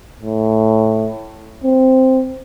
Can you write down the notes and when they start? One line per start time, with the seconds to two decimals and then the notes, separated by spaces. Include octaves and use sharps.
0.23 A2
1.64 C4